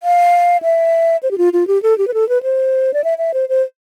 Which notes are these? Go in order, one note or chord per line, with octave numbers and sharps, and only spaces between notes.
F5
E5
C5
G4
F4
F4
G4
A4
G4
B4
A4
B4
C5
D5
E5
E5
C5
C5